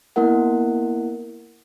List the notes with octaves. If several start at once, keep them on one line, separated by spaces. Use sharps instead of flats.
A#3 B3 E4 A#4 F#5